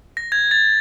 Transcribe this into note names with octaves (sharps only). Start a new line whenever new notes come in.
A#6
G#6
A6